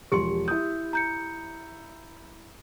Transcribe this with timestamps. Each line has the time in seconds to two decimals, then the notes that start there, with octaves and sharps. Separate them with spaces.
0.12 E1 F3 G4 C6 C#7
0.48 E4 D#6 G6
0.93 A#5 G6 C#7